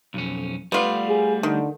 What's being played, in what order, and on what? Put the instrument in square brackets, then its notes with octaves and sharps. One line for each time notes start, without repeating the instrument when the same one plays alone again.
[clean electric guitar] B1 F2 C#4
[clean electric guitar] G3 A3 D5 [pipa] B3 F4
[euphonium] G#4
[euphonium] D3 [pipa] D#3